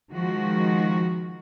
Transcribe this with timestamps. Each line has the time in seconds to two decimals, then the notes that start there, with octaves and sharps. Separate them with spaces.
0.11 D#3 F3 G#3 F#4